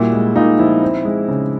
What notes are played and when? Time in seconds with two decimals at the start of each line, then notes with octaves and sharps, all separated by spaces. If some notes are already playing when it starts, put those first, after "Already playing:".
Already playing: A#2 G3 E4 F#4
0.13 G#3
0.36 A#2 D#4 F4
0.59 F3 E4
0.82 C4
1.05 G#3
1.28 C#3